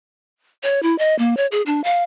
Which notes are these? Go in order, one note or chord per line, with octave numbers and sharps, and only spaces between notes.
C#5
E4
D#5
A#3
C#5
G#4
D4
F5